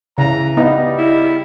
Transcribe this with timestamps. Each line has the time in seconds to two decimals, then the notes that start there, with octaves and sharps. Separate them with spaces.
0.18 C#3 E3 A#5
0.57 G3 B3 D#4 F5
0.98 E4